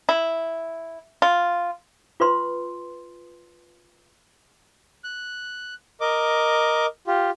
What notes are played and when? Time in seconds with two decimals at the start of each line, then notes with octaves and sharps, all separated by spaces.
0.09 E4
1.22 F4
2.20 F4 B4 C6
5.04 F#6
6.01 A#4 D#5 D6
7.07 F4 G4